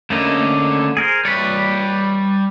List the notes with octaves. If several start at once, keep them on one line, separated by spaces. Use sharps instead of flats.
D3 A3 A#3 C#4 D#5
G#4 A#4 C5
G3 B4 C#5 D5